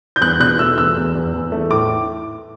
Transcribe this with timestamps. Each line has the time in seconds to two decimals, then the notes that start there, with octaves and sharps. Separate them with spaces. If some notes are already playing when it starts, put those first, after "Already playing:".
0.16 G6
0.21 E2 F#6
0.40 B2 F#6
0.59 A3 E6
0.78 E2 E6
0.96 E2
1.15 E2
1.34 E2
1.52 A3
1.71 A2 D6